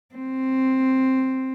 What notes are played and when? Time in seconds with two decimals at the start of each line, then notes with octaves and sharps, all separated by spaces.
0.15 C4